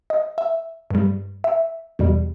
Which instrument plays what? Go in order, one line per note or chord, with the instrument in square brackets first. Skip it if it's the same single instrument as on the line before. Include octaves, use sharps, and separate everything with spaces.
[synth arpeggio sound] D#5
E5
G2 G3
E5
E2 B2 G3